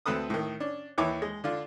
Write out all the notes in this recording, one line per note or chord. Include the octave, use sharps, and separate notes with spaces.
D2 C4 A4 B4 D#6
A2 D#3
C#4 D4
D#2 E3 E4 C#5 D6
G#3
D3 D4 F4